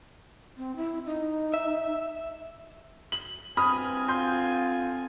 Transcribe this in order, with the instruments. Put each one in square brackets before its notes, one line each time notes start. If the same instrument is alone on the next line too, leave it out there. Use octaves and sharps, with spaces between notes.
[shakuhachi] C4
E4
D#4
[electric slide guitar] E5
[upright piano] F#7
[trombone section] G2 B3 E4 [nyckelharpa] C4 G#5 [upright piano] B5 D#6 F6
[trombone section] D3 F4 [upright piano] C6 G6